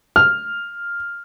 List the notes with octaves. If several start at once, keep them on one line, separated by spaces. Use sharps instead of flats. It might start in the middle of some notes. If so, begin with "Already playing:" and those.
F6